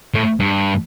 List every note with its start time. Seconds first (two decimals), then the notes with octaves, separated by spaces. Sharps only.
0.14 A2
0.40 G2